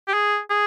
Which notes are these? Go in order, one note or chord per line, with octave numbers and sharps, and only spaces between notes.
G4
G#4
G#4